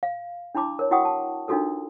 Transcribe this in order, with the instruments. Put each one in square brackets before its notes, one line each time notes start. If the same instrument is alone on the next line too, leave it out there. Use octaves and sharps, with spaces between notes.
[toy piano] F5
D4 E4 A5 B5 D6
A#4 C#5
E4 F#4 F#5 G5 C#6 D#6
A5
D4 D#4 F4 F#4 A4 A#4